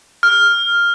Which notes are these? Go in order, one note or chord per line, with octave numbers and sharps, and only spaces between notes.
F6